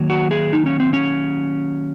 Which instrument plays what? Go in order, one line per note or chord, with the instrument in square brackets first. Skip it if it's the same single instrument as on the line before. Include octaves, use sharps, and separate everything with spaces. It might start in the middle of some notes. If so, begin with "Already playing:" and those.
Already playing: [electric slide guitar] D#3 F#3 A#3
F#4
G#4
D#4
C#4
C4
C#4